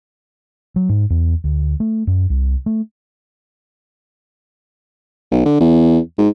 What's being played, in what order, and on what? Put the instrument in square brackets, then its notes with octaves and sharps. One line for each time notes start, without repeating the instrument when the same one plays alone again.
[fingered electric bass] F#3
G#2
E2
D2
A3
F#2
C2
A3
[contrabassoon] B1
D3
E2
G#2